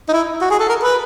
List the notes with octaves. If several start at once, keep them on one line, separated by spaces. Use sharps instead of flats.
D#4
E4
F#4
G#4
A4
A#4
B4